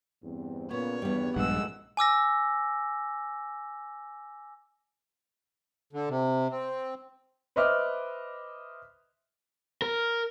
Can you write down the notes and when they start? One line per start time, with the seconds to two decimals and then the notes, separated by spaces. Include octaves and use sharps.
0.22 E2 G2 C4
0.71 A#2 C#3 B3 C#5
1.02 G#1 E2 G2 G3 B3
1.36 A#1 G2 G#3 F#5 E6
1.97 G#5 D6 E6 A#6
5.93 D3
6.09 C3
6.51 C4
7.56 B4 C5 D#5 E5 D6 F6
9.82 A#4